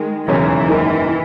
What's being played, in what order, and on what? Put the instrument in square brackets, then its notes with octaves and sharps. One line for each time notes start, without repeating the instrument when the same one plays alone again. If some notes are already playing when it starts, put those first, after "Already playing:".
Already playing: [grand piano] D#3 [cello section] G#3
[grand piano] E1 D#2 C#3 F#3 C#4 [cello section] E3
[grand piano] G#1 F#2 D#3 A#3 D#4